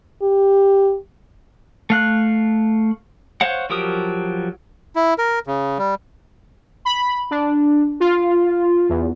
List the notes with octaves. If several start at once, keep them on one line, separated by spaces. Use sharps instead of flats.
G4
A3 F5 F#6
C5 C#5 F5 F#5
F3 F#3 G4 A#4 D#6
E4
A#4
C#3
G3
B5
D4
F4
E2